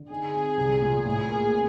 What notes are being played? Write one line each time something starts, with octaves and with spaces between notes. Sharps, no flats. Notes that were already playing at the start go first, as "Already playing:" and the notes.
Already playing: D3
D#4 G#4
C4
C2
A#2
A2 G#4
A#3
C4